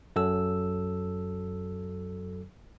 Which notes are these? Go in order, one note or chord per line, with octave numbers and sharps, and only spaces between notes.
F#2 F#3 A4 E6